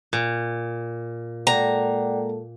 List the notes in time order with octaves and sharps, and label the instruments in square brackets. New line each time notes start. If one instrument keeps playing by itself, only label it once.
[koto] A#2
[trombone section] G#3 A#3 A4 [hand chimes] D5 F#5 G5 [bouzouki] A#5